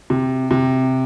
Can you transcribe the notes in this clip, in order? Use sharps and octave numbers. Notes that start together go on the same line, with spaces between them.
C3
C3